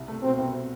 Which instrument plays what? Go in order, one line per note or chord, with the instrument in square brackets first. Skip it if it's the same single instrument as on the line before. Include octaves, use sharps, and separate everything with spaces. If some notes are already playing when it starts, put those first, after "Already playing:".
Already playing: [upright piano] C2
A3
[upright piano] B2 [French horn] C4
[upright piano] C2